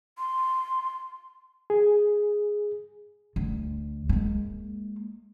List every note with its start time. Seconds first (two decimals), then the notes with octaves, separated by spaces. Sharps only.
0.18 C6
1.70 G#4
3.36 D2
4.09 G#3 A#3